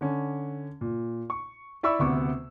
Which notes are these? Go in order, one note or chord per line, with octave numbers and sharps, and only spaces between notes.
D3 C#4
A#2
C#6
E4 D5 E5 B5 C#6 E6
D2 C3 B3 C#6 D6